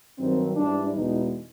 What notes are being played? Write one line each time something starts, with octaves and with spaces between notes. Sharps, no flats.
G2 D#3 F#3 C4
G#2 E3 G3 D4
E2 B2 G#3 D#4